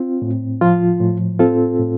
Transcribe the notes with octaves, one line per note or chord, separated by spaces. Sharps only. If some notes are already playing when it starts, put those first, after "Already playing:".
Already playing: C4 F4
A2
F3 F4
A2
C4 F4 A4
A2